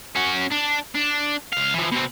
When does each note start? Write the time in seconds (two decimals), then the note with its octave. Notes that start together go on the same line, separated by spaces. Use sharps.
0.16 C#4 F#4
0.52 D4
0.95 D4
1.53 C#2 F5
1.74 E3 F3
1.92 B2 C4